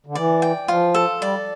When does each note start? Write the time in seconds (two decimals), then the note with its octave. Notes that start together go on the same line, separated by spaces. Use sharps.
0.06 D3
0.15 E3 D5
0.42 G5
0.68 F3 F4
0.94 A4
1.21 G3 D5